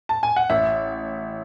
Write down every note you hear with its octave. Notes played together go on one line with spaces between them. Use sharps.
A5
G#5
F#5
A1 E5